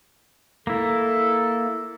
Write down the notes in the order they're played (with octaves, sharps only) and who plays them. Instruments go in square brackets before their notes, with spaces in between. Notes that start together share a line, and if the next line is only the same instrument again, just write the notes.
[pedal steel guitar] A#3 E4 [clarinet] A4